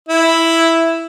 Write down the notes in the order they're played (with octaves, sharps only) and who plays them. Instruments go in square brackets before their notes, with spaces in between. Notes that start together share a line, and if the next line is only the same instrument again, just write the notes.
[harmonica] E4